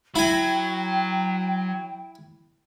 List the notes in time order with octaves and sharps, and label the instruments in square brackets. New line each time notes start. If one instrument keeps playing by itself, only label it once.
[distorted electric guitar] F#3 [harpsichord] E4 G#5 [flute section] G5